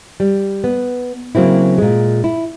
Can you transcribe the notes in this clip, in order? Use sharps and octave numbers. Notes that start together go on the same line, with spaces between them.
G3
B3
C#3 F#3 A#3 C4 E4
A#2 G#3
E4